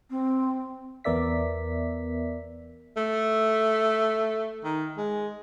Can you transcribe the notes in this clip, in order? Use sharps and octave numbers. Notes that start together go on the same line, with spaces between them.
C4
E2 B3 A#4 D5 E5 B6
A3
D#3
G#3